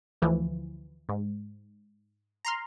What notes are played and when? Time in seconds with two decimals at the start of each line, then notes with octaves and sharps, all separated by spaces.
0.22 D2 E3 F3
1.09 G#2
2.45 A#5 C6 F6